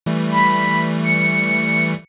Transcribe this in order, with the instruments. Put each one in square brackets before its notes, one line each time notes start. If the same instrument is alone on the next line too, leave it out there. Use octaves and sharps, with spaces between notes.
[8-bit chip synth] E3 G3 A3
[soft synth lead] B5
C#7